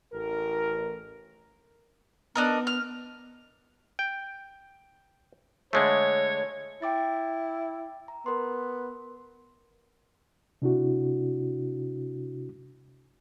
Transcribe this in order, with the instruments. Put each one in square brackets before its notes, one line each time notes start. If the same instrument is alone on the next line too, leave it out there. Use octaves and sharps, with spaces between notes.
[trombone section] A1 A#4
[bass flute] B3 [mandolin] D4 D#4 A#4
[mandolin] F6
[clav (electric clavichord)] G5
[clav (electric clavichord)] D3 G#3 A3 [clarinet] C#5
[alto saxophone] E4 [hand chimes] G5 D6 A6
[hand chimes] A#5
[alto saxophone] B3 [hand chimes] A#4 C6
[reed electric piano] C3 D4 E4 F#4